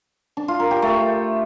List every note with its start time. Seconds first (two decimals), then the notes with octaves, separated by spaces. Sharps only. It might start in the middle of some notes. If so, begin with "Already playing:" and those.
0.37 D4
0.48 F4
0.60 A#4
0.71 G4
0.82 A3